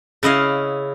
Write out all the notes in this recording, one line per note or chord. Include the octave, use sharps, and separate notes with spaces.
C#3 E4 D#5 F5